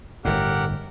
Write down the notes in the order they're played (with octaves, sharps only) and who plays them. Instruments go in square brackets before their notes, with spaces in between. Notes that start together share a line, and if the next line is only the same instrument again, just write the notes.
[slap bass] G1 A2 [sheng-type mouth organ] G4 A#4 F#5